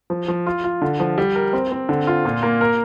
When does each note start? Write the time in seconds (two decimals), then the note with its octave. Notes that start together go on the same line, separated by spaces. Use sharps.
0.10 F3
0.28 F3
0.47 F4
0.64 F4
0.82 D3
1.00 F3
1.18 G3
1.35 A#4
1.53 C4
1.72 C4
1.89 D3
2.07 F4
2.25 A#2
2.43 A#3
2.61 A#4